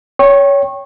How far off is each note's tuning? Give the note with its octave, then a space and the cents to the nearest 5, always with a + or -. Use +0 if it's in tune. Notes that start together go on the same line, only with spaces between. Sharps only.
C#5 +20 G5 +0 C#6 -30